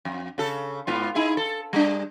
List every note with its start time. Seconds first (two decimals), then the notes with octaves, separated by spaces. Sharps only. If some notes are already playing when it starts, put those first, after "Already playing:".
0.05 F2
0.38 C#3 A4
0.87 G#2 B3 F4
1.15 D#4 E4 G#4
1.37 A4
1.73 G3 D4